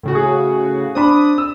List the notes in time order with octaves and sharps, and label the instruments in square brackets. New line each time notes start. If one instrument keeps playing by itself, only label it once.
[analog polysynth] A2 C#3 F#4
[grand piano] G#4
[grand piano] C4 D4 B5 [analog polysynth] D#6
[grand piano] E6